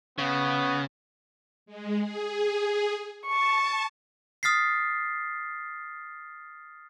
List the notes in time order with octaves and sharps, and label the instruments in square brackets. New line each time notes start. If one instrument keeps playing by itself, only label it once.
[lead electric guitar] C#3 [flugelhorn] B3
[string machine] G#3
G#4
[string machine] A5 [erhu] C#6
[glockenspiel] D#6 F6 A6 B6 C7